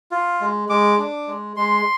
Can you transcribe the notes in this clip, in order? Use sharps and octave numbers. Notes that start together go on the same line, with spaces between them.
F4
G#3
G#3 D6
D4
G#3
G#3 C6